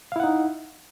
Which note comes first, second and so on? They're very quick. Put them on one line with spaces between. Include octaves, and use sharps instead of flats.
F5 E4 F#5 D#4